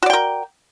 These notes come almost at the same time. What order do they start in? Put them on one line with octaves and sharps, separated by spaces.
F#4 D5 G5 A#4